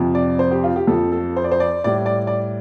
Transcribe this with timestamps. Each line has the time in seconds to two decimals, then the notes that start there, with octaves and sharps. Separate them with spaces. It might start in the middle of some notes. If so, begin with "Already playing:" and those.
Already playing: F2 C3 F3
0.15 D5
0.39 C5
0.51 G4
0.64 F4
0.76 G4
0.87 F2 F3 A4
1.12 A4
1.37 C5
1.44 D5
1.51 C5
1.60 D5
1.84 A2 G3 D5
2.06 D5
2.27 D5